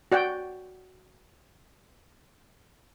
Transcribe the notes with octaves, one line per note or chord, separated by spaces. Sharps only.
F#4 D5 F#5 G5